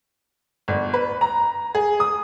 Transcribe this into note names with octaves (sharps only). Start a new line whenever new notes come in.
G1
B4
A#5
G#4
D#6